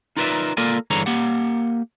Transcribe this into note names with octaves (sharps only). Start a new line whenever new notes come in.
D#4 F4 A#4 B4 D5 E5
A#3 F4 A4 A#4 D5 G#5
G2 D3 E3 G#4 C#5 A#5
A#3 G4 F#5